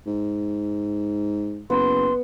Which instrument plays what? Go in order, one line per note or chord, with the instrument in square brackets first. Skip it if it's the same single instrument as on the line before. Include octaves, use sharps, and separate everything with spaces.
[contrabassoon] G#2
[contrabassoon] F#1 [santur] B3 [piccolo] C6